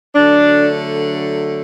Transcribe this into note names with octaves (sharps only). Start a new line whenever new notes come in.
D3 F#3 A3 D4